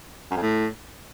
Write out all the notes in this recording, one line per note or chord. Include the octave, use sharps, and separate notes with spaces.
F#2
F2
A2